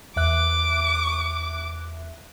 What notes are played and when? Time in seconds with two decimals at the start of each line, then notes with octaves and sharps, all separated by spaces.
0.16 E2 E5 D6 F#6